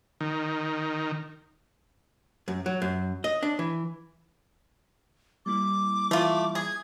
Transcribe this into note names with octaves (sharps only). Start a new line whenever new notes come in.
D#3
F#2
F#3
F#2
D#5
D4
E3
G3 A#3 E4 D6
E3 A3 F4 E5
G#4 G#6